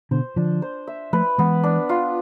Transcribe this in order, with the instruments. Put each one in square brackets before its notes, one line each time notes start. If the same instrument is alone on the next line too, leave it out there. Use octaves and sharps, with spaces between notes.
[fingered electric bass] B2 D3 [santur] C5
[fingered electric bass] D3 F3 [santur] D4
[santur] C5
E5
[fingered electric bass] F3 A3 [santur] B4
[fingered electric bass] E3 G#3 [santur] B3
[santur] D4
F4